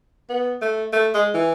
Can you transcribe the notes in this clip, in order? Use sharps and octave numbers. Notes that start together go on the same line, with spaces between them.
B3
A3
A3
G#3
E3